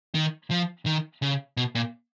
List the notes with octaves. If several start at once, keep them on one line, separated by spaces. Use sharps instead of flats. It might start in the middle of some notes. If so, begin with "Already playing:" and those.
D#3
F3
D#3
C#3
B2
A#2